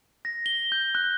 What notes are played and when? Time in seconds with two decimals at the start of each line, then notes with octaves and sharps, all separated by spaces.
0.25 A#6
0.46 G7
0.72 G6
0.95 F#6